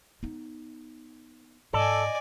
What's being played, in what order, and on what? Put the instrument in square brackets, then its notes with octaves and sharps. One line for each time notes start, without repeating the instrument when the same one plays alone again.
[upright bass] B3 D#4
[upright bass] G#2 [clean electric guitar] A4 [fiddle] D5 G#5 [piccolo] D#5